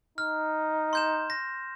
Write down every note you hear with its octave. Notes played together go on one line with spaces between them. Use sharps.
D#4 F6
C6 G6 E7
A#6